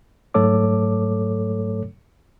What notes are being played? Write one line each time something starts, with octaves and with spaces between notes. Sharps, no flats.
G#2 F#3 A3 A4 C#5 D6